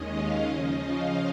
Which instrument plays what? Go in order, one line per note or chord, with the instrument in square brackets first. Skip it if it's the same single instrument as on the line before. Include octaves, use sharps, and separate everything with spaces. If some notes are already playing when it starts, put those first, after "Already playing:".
Already playing: [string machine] D#2 D#3 G#3 C#4 D#5
F5
C#3 F3 C#4 D#5
F5